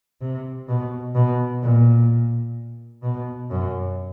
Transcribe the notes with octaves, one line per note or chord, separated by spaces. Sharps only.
C3
B2
B2
A#2
B2
F#2